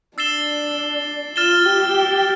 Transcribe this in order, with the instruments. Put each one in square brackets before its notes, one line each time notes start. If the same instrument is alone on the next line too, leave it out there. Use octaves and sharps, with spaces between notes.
[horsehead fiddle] D4 [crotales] E6 A6 C7 E7 G7
[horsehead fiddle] F4 [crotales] F6 A6 E7 G7
[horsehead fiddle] G4